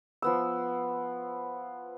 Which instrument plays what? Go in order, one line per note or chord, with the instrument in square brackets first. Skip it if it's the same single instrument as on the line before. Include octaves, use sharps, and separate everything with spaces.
[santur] F3 B3 E6